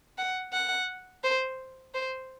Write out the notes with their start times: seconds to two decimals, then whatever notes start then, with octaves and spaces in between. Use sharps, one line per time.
0.18 F#5
0.53 F#5
1.24 C5
1.94 C5